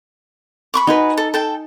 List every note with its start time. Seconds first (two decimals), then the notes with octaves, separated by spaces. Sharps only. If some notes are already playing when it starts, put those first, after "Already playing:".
0.74 B5 C#6 D6
0.87 D#4 F#4 B4 G#5
1.17 A4
1.34 A4 G5 A5